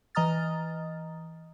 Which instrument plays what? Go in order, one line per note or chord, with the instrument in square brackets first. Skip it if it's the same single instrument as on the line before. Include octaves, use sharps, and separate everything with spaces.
[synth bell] E3 D#5 A#5 D#6 F6 A6